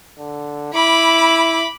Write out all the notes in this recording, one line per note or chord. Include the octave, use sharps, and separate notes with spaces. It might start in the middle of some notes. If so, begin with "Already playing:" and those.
D3
E4 B5 D6